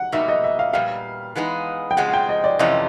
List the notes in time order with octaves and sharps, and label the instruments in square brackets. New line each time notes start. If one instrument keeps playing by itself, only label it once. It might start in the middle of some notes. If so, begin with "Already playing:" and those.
Already playing: [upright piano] F#5
[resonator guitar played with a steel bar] B2 G3 A#3 D#4 F#4 [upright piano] E5
[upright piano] D#5
E5
F5
[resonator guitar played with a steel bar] A#2 G3 B3 [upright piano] F5
[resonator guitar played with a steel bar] E3 G#3 B3 D#4 G#4
[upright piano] G5
[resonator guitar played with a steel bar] C#3 F3 G#3 C4 [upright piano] F#5
[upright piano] F#5
G5
D#5
D5
[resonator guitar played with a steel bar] F2 C3 E3 A3 C#4 [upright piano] D#5